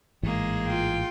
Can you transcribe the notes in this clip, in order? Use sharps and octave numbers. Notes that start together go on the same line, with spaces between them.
A1 G#2 E3 G#3 A#3 G#4
F4 G5